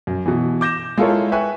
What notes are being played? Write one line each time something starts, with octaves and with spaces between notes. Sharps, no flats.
F#2
B2 E3
D6 G6 A#6 E7
G#3 E4 F4 A4 A#4 C#5
B4 E5 G5 G#5 C#6 F#6